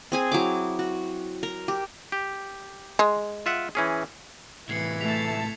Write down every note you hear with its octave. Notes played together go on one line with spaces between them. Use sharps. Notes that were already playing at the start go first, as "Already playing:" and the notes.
C4 G#4 G#5
F#3 E4 D6
F#4
A#4
G4
G4
G#3
F4 E5 F#5
E3 C#4 G#4
A2 C3 E3 G#6 C7 C#7
A3 A5 B6 F7